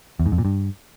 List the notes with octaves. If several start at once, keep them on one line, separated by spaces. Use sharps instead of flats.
E2
G#2
F2
A#2
G2